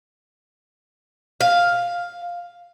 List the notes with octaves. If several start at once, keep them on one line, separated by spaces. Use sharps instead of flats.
F5